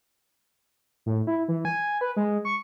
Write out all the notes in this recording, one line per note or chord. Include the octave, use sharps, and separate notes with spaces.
A2
E4
E3
G#5
B4
G#3
C#6